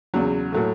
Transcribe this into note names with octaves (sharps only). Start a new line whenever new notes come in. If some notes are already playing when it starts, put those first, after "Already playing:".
E2 C#3 F#3
A2 F#3 A3